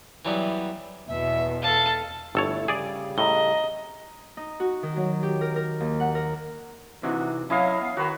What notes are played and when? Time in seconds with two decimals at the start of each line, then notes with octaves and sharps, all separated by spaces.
0.25 E3 F#3 G3 B3
1.08 E2 B2 E5
1.62 A4 F5 A5
2.35 G1 A3 E4 A4 C#5
2.68 C#3 G3 G#4 D5
3.18 A2 D#5 A#5 G7
4.37 D#4
4.60 F#4
4.83 D#3
4.96 F#3
5.23 G4
5.41 A#4
5.56 A#4
5.80 D#2
6.00 F#5
6.15 A#4
7.03 C3 E3 D#4 F#4
7.50 F#3 C#4 E4 D#5 F5
7.81 B3
7.97 D#3 F#4 B4